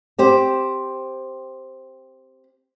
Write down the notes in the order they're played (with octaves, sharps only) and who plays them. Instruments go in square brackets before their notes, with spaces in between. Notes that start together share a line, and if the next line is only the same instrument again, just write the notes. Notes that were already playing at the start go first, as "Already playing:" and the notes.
[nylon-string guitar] C4 G4 C5